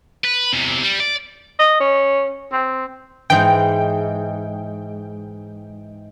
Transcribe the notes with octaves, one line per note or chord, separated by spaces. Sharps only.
B4
E2 C3
G3
D5
D#5
C#4
C4
G#2 E3 G5